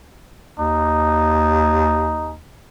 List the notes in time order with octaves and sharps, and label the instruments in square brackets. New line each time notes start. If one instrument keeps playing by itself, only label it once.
[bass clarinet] D#2 [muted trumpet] D#4